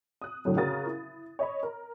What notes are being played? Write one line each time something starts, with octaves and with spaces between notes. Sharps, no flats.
D#6 F#6
F#2 A2 D3 F#3
C#3 F#4 A#4 D#6 A6
E4
C#5 D#5 B5
A#4